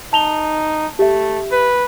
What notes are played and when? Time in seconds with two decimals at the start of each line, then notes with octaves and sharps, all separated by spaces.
0.13 D#4 A5 F7 G7
0.99 A3 G4 E5
1.52 B4